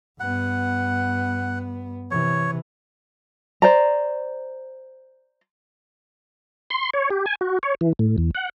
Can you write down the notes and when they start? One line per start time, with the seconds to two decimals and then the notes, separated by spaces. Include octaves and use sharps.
0.20 G2 B3 F#5
2.11 C3 E3 C#5
3.62 C5 D5 A#5
6.70 C6
6.94 C#5
7.10 G4
7.26 G#5
7.41 F#4
7.63 C#5
7.81 E3
7.99 A2
8.18 E2
8.35 F#5